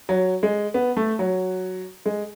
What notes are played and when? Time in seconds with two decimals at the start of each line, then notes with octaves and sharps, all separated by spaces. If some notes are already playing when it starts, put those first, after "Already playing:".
0.09 F#3
0.43 G#3
0.74 B3
0.97 A3
1.19 F#3
2.06 G#3